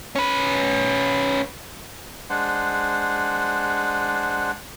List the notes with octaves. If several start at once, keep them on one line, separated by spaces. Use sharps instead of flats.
C#4 B4
G#3 D4 C5 F#5